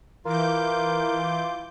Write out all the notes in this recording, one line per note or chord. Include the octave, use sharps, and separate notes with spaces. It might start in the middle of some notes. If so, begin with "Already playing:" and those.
E3 F4 A#4 D6 G6